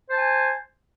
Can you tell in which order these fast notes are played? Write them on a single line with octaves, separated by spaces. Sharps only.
C5 A5 G#5